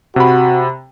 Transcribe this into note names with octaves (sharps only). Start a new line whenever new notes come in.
C3 F#4 B5